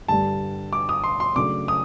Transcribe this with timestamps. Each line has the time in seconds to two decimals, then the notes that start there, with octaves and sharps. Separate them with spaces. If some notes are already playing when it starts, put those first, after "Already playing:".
0.08 G2 D3 G3 A5
0.73 D6
0.89 D#6
1.04 C6
1.20 C6
1.36 C#3 F#3 A3 D4 D6
1.68 D#6